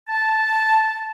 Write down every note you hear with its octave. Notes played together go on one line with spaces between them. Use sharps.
A5